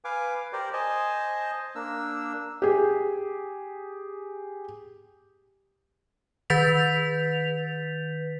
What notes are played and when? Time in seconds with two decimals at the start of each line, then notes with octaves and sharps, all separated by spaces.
0.05 B4 F5 G#5 D6
0.53 G4 A#4 C5 D5
0.73 C5 D#5 G#5 A5
1.75 A#3 D4 E6
2.62 G4 G#4
6.50 D#3 B4 G6 A6 B6 F7